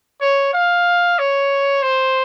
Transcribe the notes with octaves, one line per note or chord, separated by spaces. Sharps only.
C#5
F5
C#5
C5